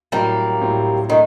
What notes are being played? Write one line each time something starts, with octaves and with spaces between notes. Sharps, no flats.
A2 F#3 G3 A#3 C4
A2 F#3 C4
D#3 A3 D4